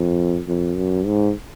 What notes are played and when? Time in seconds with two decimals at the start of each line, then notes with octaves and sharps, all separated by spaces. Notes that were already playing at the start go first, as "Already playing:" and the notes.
Already playing: F2
0.48 F2
0.77 F#2
1.06 G#2